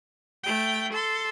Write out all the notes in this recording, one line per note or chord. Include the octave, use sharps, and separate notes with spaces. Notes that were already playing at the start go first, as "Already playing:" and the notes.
A3 G5
A4 C6